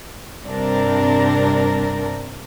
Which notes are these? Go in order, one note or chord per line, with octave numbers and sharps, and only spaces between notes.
G2 C3 C4 D4 A#4